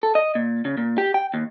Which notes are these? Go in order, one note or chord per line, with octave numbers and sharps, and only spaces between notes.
A4
D#5
A#2
C#3
A#2
G4
G5
D#2